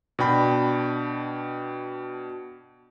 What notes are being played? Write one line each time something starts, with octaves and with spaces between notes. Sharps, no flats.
B2 D4 G5 B5